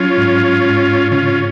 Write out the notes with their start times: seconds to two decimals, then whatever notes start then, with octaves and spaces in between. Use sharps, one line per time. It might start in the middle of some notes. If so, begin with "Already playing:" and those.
Already playing: F#3 C#4 F4
0.17 G#2
0.65 G#2
1.12 C#3 C#4 F4